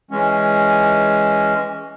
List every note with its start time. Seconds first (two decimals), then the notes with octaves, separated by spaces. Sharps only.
0.11 E3 G#3 C#4